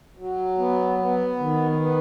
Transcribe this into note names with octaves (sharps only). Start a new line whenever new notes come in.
F#3
B3
B3
D#3
B3